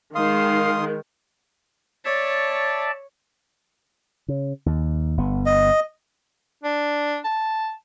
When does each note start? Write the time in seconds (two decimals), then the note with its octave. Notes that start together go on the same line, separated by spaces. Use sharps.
0.15 D#3 G#3 F5 C6 D#6
2.05 C#5 D5 E5 A5
4.28 C#3
4.66 D#2
5.17 G1 B3
5.46 D#5
6.63 D4
7.25 A5